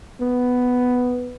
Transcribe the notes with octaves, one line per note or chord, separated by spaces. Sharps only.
B3